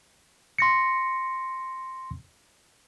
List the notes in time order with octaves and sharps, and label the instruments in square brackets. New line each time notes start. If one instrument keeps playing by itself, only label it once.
[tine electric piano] C6 A#6 C#7